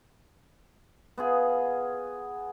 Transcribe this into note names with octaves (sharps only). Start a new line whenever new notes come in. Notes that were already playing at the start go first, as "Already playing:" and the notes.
B3 F4 G#4